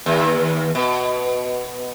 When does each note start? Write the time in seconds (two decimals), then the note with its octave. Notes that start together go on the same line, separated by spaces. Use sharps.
0.06 D#2
0.75 B2